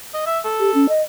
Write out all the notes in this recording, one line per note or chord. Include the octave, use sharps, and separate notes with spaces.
D#5
E5
A4
G4
C#4
D#5